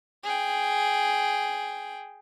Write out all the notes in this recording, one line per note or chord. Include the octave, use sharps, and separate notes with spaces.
G#4 G5